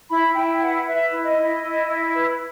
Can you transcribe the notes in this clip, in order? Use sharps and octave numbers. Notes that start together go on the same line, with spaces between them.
E4 B5
E4 G5
B4 F#5
B4 E5
E4
D#5
E4
E4
E4
B4